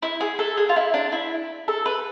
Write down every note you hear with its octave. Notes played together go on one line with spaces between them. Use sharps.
E4
G#4
A4
G#4
F4
E4
D4
E4
A4
B4